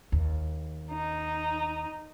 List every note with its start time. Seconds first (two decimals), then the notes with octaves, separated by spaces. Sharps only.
0.12 D#2
0.92 D#4